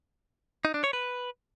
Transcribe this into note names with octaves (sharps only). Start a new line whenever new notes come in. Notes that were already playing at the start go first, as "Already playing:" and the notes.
D#4
D4
C#5
B4